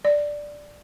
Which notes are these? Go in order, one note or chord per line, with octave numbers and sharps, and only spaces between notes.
D5